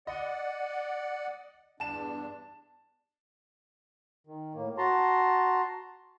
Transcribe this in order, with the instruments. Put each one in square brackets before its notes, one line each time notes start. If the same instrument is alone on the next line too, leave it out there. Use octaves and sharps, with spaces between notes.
[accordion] D5 F#5 [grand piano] D#5
[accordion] E2 G2 D4 [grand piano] A5 E7
[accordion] D#3
A2 A#3
F#4 A5 A#5 C6